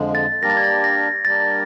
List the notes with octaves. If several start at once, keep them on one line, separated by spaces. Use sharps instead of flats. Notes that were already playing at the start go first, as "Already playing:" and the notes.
Already playing: F2 D3 F3 G#3
A6
G3 A#3 D4 G4 A#4 A#6
A6
G#6
A6
A#6
G3 A#3 D4 G4 A#4 A6